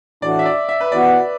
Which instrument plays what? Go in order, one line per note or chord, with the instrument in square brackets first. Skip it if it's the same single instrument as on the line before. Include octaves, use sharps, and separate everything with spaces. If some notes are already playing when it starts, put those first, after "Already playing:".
[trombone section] A2 E3 D4 F#4 [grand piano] D5
[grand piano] E5
D5
E5
B4
[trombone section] E3 B3 F#4 [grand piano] D5